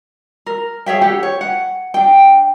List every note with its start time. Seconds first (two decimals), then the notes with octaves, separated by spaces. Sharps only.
0.46 A#4
0.86 G#4 C#5 E5 G5
1.01 D4 G4 A4 F#5
1.23 C#5
1.41 F#5
1.94 D4 G5